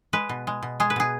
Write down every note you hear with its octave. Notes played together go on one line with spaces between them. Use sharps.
G#3 B4
B2
G#3
B2
G#3 G#4
B4
B2 G#4